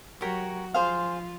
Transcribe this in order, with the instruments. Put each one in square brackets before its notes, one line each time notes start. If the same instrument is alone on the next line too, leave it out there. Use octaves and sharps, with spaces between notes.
[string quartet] F#3 F#4 [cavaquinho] G4 A#4 C#5
[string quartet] F3 F4 [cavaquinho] G#4 C5 F5